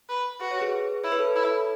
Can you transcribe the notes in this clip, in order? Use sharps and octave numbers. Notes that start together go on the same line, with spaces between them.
B4
F#4 B4
C#5
G#4 B4
E4 C#5
B4
A4 C#5
E4